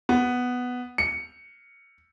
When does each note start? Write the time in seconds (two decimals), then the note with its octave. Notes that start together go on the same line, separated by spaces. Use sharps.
0.09 B3
0.98 C#7